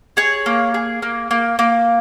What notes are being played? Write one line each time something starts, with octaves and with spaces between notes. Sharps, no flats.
G#4 C#5
A#3
G#4
A#3
A#3
A#3